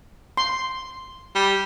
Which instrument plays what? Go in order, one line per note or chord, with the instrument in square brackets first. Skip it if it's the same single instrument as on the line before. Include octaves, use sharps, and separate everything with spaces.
[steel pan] C6
[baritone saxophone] G3